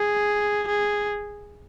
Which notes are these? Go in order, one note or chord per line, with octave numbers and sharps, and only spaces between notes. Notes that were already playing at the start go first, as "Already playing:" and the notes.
Already playing: G#4
G#4